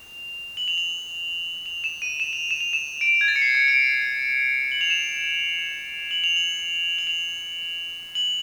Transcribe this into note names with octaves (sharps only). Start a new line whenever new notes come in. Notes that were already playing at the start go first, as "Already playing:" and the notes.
Already playing: F7
F#7
F7
F#7
F7
E7
D#7
E7
F7
E7
F7
E7
D7
G#6
A6
C#7
C7
C#7
D7
F#7
F7
E7
F#7
F7
F#7
F#7
F7
F#7